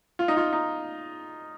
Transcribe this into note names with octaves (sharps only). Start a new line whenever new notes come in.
F4
D#4
F4
D#4